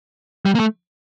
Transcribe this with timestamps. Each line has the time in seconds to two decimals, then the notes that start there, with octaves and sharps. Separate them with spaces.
0.45 G3
0.55 A#3
0.60 A3